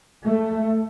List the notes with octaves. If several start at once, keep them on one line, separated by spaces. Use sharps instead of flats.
A3